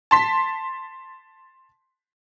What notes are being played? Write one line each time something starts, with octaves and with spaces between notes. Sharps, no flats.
A5 C6 B6